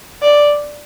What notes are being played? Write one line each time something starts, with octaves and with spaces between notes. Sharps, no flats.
D5